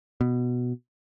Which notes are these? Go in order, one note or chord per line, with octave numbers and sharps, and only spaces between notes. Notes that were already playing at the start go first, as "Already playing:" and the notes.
B2